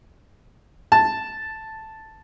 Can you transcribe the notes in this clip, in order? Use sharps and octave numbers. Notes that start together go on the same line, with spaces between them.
A5